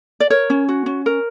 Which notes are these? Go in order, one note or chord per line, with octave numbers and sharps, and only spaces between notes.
D5
A#4 C#5
C#4
F#4
C#4
A#4